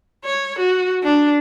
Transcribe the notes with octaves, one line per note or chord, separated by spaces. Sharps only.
C#5
F#4
D4